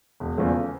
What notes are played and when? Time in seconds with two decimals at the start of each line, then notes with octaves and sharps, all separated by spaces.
0.20 E1
0.38 E2 C#3 F3 A3